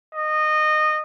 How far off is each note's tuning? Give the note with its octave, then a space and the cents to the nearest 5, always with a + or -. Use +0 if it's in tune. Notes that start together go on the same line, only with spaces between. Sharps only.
D#5 -20